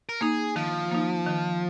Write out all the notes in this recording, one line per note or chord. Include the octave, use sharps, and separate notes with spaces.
A#4
A#3 D#4 G#4
D#3 F3
A#3 D#4
D#3